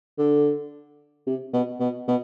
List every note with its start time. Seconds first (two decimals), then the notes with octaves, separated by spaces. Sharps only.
0.18 D3
1.27 C3
1.53 B2
1.80 B2
2.08 B2